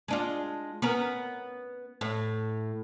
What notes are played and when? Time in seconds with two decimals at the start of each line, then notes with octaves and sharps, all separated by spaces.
0.08 G#3 D4 F4
0.82 B3 C#4 A#4
2.01 A2